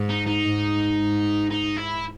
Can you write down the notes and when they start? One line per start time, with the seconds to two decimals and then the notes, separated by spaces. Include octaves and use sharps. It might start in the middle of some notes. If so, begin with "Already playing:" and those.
Already playing: G#2
0.10 D#4
0.27 D#4
0.45 G#2
0.98 G#2
1.51 D#4
1.77 E4